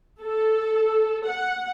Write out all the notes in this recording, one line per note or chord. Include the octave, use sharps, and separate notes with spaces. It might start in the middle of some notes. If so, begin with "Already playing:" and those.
A4
F#5